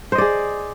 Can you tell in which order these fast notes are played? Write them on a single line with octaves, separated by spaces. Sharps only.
C5 D#5 D5 G#4